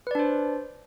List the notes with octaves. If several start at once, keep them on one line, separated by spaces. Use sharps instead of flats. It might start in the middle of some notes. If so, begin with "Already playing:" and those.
D4 B4 C5 D5